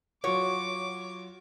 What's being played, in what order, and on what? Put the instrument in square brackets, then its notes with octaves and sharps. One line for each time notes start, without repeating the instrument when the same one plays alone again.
[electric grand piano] F#3 F4 F#4 [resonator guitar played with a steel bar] C#5 [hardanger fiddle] D6